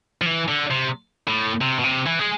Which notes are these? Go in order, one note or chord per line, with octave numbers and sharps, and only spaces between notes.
F3
E3
D3
C3
A2
C3
B2
C3
E3
G#3